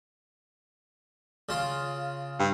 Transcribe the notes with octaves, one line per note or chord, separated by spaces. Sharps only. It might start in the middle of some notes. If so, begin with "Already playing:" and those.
C#3 F4
G2